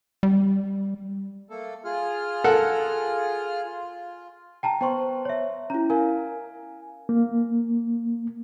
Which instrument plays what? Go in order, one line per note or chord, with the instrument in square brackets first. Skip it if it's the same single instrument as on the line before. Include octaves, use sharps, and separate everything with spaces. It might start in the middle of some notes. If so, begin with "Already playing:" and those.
[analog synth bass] G3
[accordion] A3 A#3 A4
F4 G#4 F6
[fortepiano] A4 A#4 F#5
[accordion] F4
[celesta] G5 A5 A#5
[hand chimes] B3 C5 C6 [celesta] G5 C#6
[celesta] C#5 E5
[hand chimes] C#4 E4 [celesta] A#5
[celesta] A#4 [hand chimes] F5 G#5
[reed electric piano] A#3